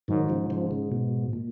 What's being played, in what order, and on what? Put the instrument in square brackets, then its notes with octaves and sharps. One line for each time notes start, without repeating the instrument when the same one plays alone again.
[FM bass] G#2 [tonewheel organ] D#3 F#3
[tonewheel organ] C#3 F3
C#3 F3
C#3
B2
A#2